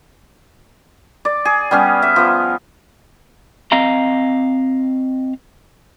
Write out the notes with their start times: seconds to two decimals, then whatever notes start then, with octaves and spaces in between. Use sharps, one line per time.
1.25 D5
1.45 G#4
1.71 G3 B3 C#4 G#4
2.02 E5
2.16 F3 B3
3.72 C4 D#5 F5 A#5